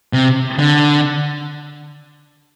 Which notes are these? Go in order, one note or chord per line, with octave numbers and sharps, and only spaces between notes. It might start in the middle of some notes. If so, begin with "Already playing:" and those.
C3
D3